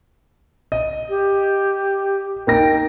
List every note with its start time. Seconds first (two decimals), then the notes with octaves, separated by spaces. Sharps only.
0.72 D#5
1.09 G4
2.47 A#3 D#4 G5 A#6